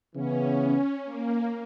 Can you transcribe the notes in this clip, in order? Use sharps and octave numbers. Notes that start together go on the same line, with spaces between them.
C#3 E3 B3 C#4
A#3